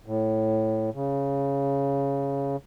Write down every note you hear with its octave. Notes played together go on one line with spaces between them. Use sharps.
A2
C#3